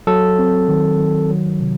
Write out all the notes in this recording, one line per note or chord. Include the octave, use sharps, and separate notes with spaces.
F#3 A4
C4
D#3
D#3
F#3
C3